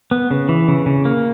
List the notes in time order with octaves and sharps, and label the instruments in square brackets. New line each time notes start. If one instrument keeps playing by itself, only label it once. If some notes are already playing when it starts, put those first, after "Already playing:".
[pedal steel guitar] B3
C#3
E3
C#3
C#3
A#3